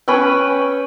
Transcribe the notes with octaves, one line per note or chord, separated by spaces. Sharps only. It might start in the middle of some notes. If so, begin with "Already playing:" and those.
C#4 B4 G5